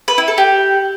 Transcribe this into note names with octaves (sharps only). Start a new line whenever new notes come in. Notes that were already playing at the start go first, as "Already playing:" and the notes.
B4
E4
A4
G4